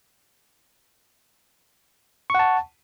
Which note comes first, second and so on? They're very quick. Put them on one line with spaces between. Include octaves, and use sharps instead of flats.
C#6 F#5 A5